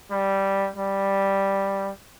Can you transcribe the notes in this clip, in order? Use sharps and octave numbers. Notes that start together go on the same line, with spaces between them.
G3
G3